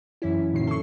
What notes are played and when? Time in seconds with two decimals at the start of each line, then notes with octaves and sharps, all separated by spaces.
0.22 F#2 E3 C#4 E4
0.53 A#2 D3 D#3 F#3 C#4 C7
0.67 A4 C#6